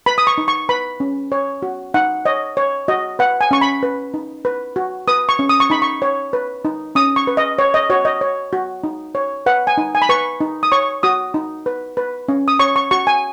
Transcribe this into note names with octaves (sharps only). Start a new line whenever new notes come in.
B4 B5
D#6
C#6
D#4
C#6
B4 B5
C#4
C#5
F#4
D#4 F#5
C#5 D#5
C#5
F#4 D#5
B4 F#5
G#5
C#4 C#6
B5
B4
D#4
B4
F#4
B4 D#6
C#6
C#4
D#6
C#6
D#4 B5
C#6
C#5
B4
D#4
C#4 D#6
C#6
B4
D#5
C#5
D#5
F#4 C#5
D#5
C#5
F#4
D#4
C#5
B4 F#5
G#5
D#4
G#5
B5
B4 C#6
D#4
D#6
C#5 C#6
F#4 D#6
D#4
B4
B4
C#4
D#6
C#5 C#6
C#6
F#4 C#6
G#5